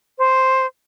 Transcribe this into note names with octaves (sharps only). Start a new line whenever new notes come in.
C5